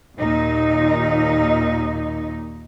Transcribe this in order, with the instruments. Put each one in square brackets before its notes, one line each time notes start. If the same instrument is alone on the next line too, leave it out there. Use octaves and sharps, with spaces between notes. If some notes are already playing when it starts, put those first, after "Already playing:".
[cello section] D#2 A#2 D#4